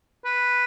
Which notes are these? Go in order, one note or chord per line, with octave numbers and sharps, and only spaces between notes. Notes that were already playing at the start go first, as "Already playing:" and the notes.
B4